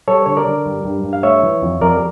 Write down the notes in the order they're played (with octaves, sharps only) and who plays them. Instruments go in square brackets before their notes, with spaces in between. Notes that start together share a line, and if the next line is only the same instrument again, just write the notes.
[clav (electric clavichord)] G3 A4 C#5
D3 C#5
A#4 D5
D3
G2
G2
G2
F5
A3 C#5 E5
E3
F2
F2 A#4 D5